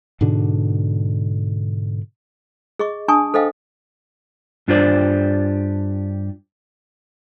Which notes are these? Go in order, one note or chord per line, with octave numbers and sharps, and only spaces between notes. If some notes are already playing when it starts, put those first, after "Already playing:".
G#2 B2 D3 D4
G#4 D#5 C#6
D4 G#5 A5 C#6 D#6
A4 C5 D#5 F5 G5
G2 D4 F4 G4 C5 D5